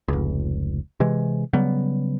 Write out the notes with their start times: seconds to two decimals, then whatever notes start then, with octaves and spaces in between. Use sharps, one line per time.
0.08 F1 C#2
1.00 C3 E3 G#3
1.53 C#3 F#3 G3 B3